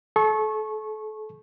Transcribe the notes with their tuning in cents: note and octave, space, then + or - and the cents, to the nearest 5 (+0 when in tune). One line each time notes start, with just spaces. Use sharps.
A4 -35 C#6 -20